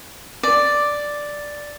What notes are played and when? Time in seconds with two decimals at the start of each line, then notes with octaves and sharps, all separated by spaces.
0.43 D5